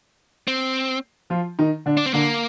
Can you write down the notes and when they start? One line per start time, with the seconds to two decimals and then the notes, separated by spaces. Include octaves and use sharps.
0.48 C4
1.30 F3 F4
1.59 D#3 D#4
1.86 D3 D4
1.97 D4
2.06 C4
2.14 D3 A#3 D4